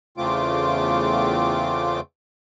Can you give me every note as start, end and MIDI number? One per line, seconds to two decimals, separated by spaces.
0.17 2.00 40
0.17 2.00 49
0.17 2.00 57
0.17 2.00 60
0.17 2.00 65
0.17 2.00 86